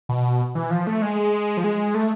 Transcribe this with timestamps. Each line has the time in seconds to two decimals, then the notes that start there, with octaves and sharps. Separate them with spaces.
0.09 B2
0.55 E3
0.71 F3
0.87 A3
1.02 G#3
1.57 F3
1.64 G#3
1.95 A3